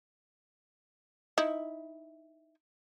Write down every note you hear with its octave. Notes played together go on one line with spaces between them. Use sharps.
D#4 E4